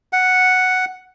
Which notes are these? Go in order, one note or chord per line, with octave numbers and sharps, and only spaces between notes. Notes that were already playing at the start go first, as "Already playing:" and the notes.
F#5